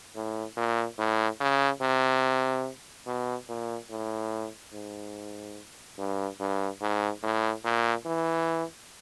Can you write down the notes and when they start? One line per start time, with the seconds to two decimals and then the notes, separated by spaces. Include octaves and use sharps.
0.15 A2
0.57 A#2
0.98 A2
1.40 C#3
1.82 C3
3.07 B2
3.49 A#2
3.90 A2
4.73 G#2
5.98 G2
6.40 G2
6.81 G#2
7.23 A2
7.65 A#2
8.06 E3